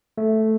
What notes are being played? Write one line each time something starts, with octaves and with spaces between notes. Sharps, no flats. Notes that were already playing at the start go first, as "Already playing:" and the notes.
A3